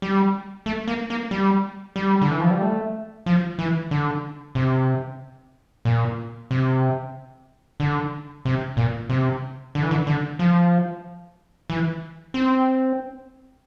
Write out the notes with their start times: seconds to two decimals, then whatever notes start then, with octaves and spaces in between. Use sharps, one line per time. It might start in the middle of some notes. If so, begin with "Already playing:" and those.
0.02 G3
0.66 A3
0.88 A#3
1.10 A#3
1.31 G3
1.96 G3
2.22 D3
2.31 E3
2.41 F3
2.51 G3
2.61 A3
3.26 F3
3.59 E3
3.91 D3
4.55 C3
5.85 A#2
6.51 C3
7.80 D3
8.45 C3
8.77 A#2
9.09 C3
9.75 D3
9.82 E3
9.91 D3
10.07 D3
10.39 F3
11.70 E3
12.34 C4